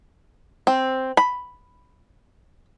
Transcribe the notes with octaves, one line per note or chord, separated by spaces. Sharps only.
C4
B5